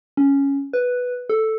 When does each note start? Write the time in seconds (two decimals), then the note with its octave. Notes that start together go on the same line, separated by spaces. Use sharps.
0.17 C#4
0.73 B4
1.29 A4